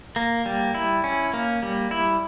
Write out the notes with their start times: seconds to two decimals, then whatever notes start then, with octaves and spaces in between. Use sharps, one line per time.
0.16 A#3
0.46 G3
0.75 E4
1.04 C#4
1.34 A#3
1.63 G3
1.91 E4